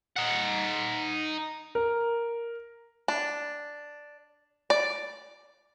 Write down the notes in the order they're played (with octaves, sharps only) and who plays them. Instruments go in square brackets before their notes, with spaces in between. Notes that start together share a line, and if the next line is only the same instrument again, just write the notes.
[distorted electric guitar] D#4 F#5
[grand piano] A#4
[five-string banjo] D4
D5